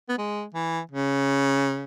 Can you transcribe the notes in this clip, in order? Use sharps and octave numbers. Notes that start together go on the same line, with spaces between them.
B3
G#3
E3
C#3